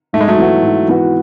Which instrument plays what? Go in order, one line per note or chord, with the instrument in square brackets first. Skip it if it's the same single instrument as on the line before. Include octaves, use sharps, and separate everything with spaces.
[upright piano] G#2 [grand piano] A3
[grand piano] G#3
F#3 A3
[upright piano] E3 B3 F#4
G#2
E3 B3 F#4